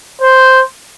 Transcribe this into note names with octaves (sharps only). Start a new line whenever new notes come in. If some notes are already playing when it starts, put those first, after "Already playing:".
C5